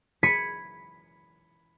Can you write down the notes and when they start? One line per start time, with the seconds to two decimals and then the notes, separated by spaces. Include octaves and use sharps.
0.23 B5 G#6 B6 C#7 D#7